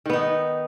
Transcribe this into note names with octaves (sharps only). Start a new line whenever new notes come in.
D#3 B3 D#4